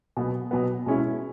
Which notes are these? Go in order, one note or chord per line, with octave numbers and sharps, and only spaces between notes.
B2 F#3 B3
B2 F#3 B3
B2 G#3 C#4 E4